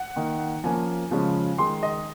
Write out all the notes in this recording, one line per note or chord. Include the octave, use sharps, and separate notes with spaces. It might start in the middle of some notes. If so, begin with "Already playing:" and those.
Already playing: F#5
D#3 A#3 D#4
F3 A#3 C#4 G#5
C#3 F3 G#3 C#4
D#3 G#3 D#4 C6
D#5